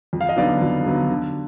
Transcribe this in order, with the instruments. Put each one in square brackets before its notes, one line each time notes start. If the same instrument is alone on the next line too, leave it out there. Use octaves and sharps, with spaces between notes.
[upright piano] F2
F5
D#5
D3 F#3 B3 D#4 D5 F5
F2
D3 F#3 B3 D#4
D3